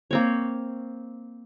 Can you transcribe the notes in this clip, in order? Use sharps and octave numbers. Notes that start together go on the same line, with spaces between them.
A#3 C4 C#5